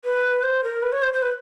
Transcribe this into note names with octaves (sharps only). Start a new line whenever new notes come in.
B4
C5
A#4
B4
C#5
C5
C5
B4